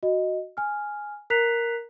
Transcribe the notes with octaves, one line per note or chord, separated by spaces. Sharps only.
F#4 D#5
G#5 F6
A#4 A#5 F#6 B6 C7 F7